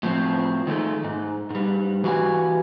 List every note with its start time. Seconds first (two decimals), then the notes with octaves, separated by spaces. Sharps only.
0.03 A2 F3 C4
0.67 D#3 G#3 A3
1.04 G#2
1.50 G#2 G3
2.04 E3 F#4 G4 F5 G#5